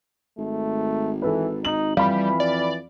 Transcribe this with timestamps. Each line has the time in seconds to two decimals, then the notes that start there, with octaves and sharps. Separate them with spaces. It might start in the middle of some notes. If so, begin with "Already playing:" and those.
0.38 G#1 A3
1.22 E3 A4 B4
1.65 D#4 F#7
1.97 F2 E3 G3 F5 B5
2.40 D5